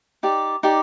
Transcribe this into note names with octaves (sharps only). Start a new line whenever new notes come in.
D#4 G4 D5
D#4 G4 D5